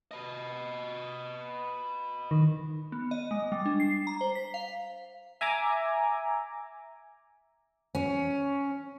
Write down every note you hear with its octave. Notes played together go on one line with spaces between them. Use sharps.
B4 D#5
D#3
B3
D#5
G#3
G3
D4
C7
A#5
C5
B6
F5
E5 G#5 A#5 D6
C#4